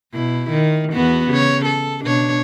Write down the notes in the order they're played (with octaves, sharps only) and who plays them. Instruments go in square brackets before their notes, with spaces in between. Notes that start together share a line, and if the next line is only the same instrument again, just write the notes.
[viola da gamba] B2 E4
D#3
E2 B3 F#4
C#3 C#5
A4
B2 D4 C#5